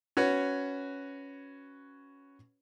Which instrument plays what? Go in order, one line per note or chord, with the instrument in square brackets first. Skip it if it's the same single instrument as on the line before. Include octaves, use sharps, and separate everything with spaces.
[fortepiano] C#4 F#4 B4 C#5